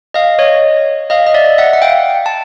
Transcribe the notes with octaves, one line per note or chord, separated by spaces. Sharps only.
D#5 F5
C#5 D#5
D#5 F5
D#5
D5 E5
E5 F#5
F#5
F5 G5
A5